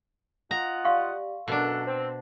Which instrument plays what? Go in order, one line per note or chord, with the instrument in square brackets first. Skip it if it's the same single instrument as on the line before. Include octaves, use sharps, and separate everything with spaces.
[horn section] F4 D#5 F#5 [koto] A#5
[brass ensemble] G4 D5 [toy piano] F5 C6 C#6
[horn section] F#2 A4 F#5 [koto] B2 D4 [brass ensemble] A#4
[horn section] C4 [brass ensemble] C5